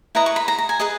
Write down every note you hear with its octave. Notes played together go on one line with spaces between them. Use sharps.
E4 B4 D#5 A#5
C#6
B5
A#5
A#5
G#5
G#4 B4 D#5